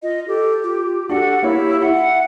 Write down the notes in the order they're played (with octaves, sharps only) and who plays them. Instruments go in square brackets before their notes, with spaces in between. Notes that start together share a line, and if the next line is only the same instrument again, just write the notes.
[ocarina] F4 [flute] D#5
[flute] G4 [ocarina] A4
[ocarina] F4
[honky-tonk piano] D4 F#4 A4 [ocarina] G4 [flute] F#5
[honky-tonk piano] A#3 C#5 [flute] E4
[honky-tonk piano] E4 [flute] F#5